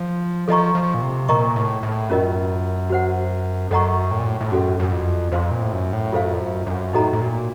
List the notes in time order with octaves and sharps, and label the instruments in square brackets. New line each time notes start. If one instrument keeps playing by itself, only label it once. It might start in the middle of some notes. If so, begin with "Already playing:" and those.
Already playing: [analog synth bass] F3
[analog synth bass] F3 [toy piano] A4 D#5 A#5 C#6
[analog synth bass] F3
A#2
C3
[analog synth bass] A#2 [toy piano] A#4 D#5 A#5 C#6
[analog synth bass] A2
A2
[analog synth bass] F#2 [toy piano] C#4 F4 A#4 D#5
[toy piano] F#4 C5 F#5
[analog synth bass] F#2 [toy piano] A4 D#5 F#5 A#5 C#6
[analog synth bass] A2
A#2
A2
A2
[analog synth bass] F#2 [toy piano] C#4 F#4 A4
[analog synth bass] F#2
F2
[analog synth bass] F2 [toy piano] C5 F5 C6
[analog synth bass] A#2
A2
F#2
A2
[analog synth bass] F#2 [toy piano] F4 A4 C5 F5
[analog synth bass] F2
F#2
F#2
[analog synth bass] A2 [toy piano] D#4 F#4 A4 D#5 A#5
[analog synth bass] A2
A#2